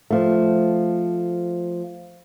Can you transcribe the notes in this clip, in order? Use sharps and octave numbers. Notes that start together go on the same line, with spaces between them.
F3 A3